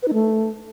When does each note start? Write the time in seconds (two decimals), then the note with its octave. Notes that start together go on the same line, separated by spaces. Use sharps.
0.03 B4
0.08 D#4
0.13 A3